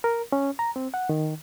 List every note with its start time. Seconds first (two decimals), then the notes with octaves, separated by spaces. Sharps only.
0.04 A#4
0.32 C#4
0.59 A#5
0.76 C4
0.94 F#5
1.09 D#3